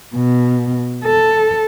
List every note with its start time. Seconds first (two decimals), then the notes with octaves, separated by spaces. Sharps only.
0.15 B2
1.04 A4